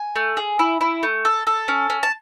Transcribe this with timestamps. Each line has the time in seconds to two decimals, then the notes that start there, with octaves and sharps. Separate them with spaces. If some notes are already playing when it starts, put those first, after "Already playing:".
Already playing: G#5
0.16 A3
0.37 G#4
0.59 E4
0.81 E4
1.03 A3
1.25 A4
1.47 A4
1.68 C#4
1.90 C#4
2.03 A5